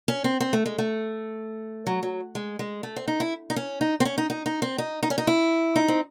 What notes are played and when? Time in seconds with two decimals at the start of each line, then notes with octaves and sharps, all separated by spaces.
0.08 C#4
0.24 C4
0.40 C4
0.53 A3
0.66 G#3
0.78 A3
1.87 F#3
2.03 F#3
2.35 G#3
2.59 G#3
2.83 A3
2.96 C4
3.08 D#4
3.20 E4
3.50 D#4
3.56 C#4
3.81 D#4
4.00 C4
4.05 C#4
4.18 D#4
4.30 D#4
4.46 D#4
4.62 C4
4.78 D#4
5.03 D#4
5.10 C#4
5.18 D#4
5.27 E4
5.76 D#4
5.88 C4